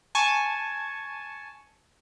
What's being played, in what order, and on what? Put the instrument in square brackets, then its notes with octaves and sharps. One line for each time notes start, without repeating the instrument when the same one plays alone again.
[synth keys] G#5 A5 C#6